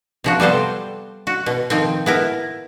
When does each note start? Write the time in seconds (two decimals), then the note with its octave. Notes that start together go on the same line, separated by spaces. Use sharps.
0.24 C3 F3 F#4
0.40 G3 B3 A4 C5
1.27 F#4
1.46 B2
1.70 D#3 F3 C4
2.06 B3 E4 A#4